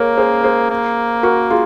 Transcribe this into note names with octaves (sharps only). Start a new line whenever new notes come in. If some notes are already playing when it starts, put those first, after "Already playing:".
Already playing: A#3 G#4 A#4 C#5
G#4 C5
G#4 C5
A#3
F#4 A#4
F4 G#4